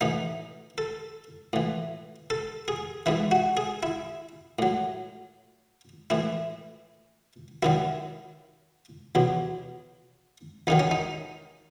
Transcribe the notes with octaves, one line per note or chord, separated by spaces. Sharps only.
A2 E3 D#4
A4
A2 E3
A4
G#4
G#2 E3 E4
F#4
G#4
E4
A2 F#3
A2 E3 E4
F#2 D#3 F#3 E4
E2 B2 F#3
E2 D#3 F#3 D#4
C#4
D#4